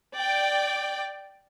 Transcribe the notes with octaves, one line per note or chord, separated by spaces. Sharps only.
D5 G5